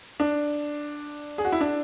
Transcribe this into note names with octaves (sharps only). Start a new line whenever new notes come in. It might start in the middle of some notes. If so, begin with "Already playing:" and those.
D4
G#4
F#4
E4
D4